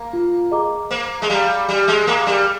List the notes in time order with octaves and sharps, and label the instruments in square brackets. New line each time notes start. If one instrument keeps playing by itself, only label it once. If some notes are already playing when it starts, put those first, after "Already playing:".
Already playing: [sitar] A#3
[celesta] F4
G#4 D#5 A#5 D6
[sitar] A#3 [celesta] C5
[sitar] G#3
[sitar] G3 [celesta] F5 A#5
[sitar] G3 [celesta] G4
[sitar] G#3
[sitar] A#3 [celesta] A#4 F5 A#5 D6
[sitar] G3